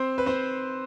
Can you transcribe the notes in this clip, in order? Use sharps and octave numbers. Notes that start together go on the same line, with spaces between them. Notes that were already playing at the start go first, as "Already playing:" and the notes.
Already playing: C4 C5
B4
C4 C5